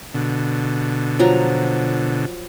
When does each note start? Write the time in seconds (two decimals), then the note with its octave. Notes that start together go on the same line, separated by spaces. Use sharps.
0.14 B2 D3
1.19 F3 F#3 A#5